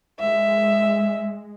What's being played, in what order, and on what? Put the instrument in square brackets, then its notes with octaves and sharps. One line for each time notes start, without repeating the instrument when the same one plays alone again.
[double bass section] G#3 [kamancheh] E5